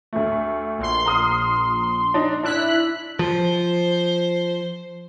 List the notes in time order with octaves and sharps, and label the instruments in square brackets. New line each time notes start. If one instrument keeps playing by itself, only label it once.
[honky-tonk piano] D2 A3
[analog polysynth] A#1 C6
[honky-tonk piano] A#5 D#6 F6
D4 D#4
[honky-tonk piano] D4 E6 [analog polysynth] E4 F#6 B6
[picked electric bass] F3 [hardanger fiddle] C5